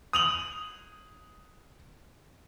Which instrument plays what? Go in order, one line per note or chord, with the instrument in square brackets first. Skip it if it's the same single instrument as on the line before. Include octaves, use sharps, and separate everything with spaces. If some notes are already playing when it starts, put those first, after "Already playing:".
[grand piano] D#6 F7 F#7